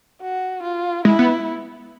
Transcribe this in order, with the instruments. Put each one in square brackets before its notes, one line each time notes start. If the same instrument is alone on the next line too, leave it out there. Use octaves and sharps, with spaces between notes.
[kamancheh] F#4
F4
[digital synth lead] G#3 [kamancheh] E4
[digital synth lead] B3